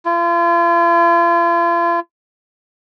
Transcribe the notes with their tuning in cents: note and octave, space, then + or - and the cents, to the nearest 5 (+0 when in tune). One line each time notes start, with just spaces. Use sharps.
F4 -40